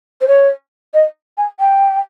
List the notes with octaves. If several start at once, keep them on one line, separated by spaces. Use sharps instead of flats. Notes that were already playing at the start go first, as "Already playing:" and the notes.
C5
C#5
D#5
G#5
G5